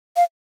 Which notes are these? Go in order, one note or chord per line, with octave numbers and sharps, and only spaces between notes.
F5